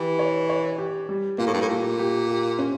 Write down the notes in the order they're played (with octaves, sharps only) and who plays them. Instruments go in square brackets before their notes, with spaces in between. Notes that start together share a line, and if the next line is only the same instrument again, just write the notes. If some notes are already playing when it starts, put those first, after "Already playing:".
Already playing: [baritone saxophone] E3 [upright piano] G4
[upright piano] C#5
C#5
G4
G3
[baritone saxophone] A#2 [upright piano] A#3
[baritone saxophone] A2
G2
A2
[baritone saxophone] A#2 [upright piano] G4
[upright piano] G4
G4
C#4